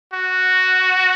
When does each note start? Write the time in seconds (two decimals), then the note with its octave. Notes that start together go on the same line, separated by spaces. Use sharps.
0.14 F#4